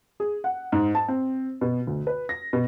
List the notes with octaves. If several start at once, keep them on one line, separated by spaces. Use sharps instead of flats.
G#4
F#5
G#2
A5
C4
B2
D2
B4
A#6
B2